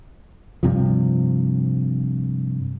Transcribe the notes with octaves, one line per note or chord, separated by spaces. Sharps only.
G2 C3 F3